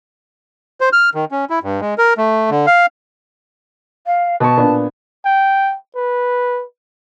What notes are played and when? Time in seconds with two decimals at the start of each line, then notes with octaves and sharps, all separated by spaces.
0.81 C5
0.93 F6
1.15 D#3
1.31 C#4
1.50 E4
1.63 G2
1.81 G#3
1.98 A#4
2.17 A3
2.50 D3
2.67 F5
4.06 F5
4.40 B2 A5 C#6
4.57 A#2 B3 D4
5.25 G5
5.95 B4